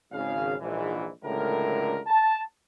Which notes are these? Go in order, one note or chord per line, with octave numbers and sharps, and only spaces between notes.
G#1 C#3 F5
A#1 G#2 E3
F#1 C#2 A2 D3 A#4
A5